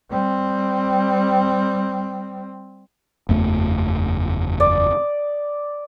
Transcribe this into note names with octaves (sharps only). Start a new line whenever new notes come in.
G3 C4
F#1 E2 A3
D5 D#6